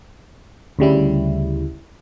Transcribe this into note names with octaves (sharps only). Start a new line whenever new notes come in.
D2 C#3 G3 E4